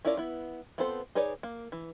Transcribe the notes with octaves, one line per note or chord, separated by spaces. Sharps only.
C#4 E4 F4 A#4 D5
B3 E4
B3 C4 F4 A4 C5
D#4 G#4 B4 C#5 D5
A#3
E3